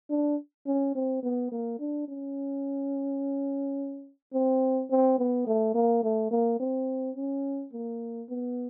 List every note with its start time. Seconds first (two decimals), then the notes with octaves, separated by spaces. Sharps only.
0.10 D4
0.66 C#4
0.95 C4
1.23 B3
1.52 A#3
1.80 D4
2.08 C#4
4.34 C4
4.90 C4
5.19 B3
5.47 A3
5.75 A#3
6.03 A3
6.31 A#3
6.60 C4
7.16 C#4
7.73 A#3
8.30 B3